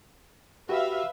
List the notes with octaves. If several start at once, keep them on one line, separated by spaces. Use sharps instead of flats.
F#4 G4 B4 E5 F5